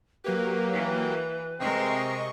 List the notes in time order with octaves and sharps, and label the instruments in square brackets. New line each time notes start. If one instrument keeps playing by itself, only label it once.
[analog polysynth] F#3 A#3 G4 [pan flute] B4
[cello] E3
[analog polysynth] C3 D#5 C#6 [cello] G#3 A#4 [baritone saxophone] C4